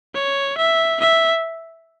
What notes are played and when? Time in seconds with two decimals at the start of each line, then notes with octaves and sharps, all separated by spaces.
0.15 C#5
0.58 E5
1.01 E5